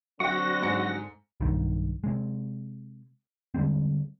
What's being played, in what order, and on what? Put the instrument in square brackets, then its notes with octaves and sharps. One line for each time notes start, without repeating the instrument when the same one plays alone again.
[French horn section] D3 C4 [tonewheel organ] F#3 F#5 A#6 [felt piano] E5 G5 [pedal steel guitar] C#6
[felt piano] G#2 G#5 C#7
[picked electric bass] B1 G2 D#3
C3 G#3
D3 G3 G#3 C4